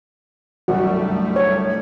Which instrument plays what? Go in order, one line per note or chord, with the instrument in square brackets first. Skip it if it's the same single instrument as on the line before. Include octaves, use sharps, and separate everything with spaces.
[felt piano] G1 C2 F#2 [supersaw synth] G3 A3 [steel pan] F#4
[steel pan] C#5